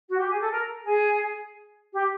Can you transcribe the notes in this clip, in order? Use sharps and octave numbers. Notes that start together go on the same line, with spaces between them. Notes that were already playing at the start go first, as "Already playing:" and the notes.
F#4
G4
G#4
A4
A#4
G#4
G4